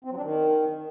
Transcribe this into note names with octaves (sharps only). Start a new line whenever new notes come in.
C4
F#3
D4
D#3